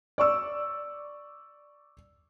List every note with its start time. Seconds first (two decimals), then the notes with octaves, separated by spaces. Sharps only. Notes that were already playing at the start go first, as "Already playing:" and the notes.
0.18 D5 C#6 E6